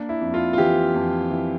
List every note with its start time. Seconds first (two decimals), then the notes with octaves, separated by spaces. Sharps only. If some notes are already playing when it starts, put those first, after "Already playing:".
Already playing: A#3 D4
0.09 E4
0.21 F2
0.34 F4
0.53 F4
0.58 E3 G4
0.95 F2
1.31 E3